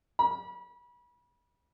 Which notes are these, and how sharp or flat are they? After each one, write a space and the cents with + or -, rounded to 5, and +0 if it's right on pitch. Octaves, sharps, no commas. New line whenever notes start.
B5 -30